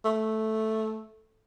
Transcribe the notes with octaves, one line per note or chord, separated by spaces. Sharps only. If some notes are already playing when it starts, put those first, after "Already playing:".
A3